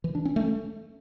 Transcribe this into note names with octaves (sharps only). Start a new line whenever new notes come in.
E3
D4
C#4
A3